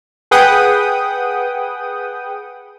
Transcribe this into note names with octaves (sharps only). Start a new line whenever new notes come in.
G#4 B4 F#5 G5 D#6